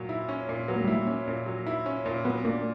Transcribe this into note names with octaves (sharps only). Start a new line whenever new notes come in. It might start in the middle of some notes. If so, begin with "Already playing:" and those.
Already playing: A#2 F#3
E4
C#4
A#2
F#3 B3
A#3
G3 E4
A#3
C#4
A#2
F#3
E4
C#4
A#2
F#3 B3
A#3 D4